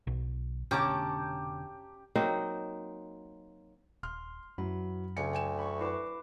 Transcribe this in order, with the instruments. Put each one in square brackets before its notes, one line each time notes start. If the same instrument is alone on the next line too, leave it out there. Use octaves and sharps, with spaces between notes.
[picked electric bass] B1
[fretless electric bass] F1 B2 D3 [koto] C#4 [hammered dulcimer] G4 [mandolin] A5 A#5 D6
[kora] F#3 A#3 C4 D#4
[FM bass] D#1 [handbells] C6 [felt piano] F6
[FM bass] F#2 [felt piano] E3 F#3 [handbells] B5
[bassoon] D2 [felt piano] C#3 G#5 C#7
[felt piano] G5 G#5 E7
[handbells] B5 C#6
E4 B4 D6